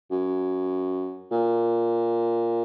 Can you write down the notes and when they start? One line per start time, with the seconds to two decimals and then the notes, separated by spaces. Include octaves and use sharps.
0.11 F#2
1.31 A#2